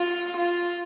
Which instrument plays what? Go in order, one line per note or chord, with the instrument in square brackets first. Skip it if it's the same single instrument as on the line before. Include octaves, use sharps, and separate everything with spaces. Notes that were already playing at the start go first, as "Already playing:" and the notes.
Already playing: [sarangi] F4
F4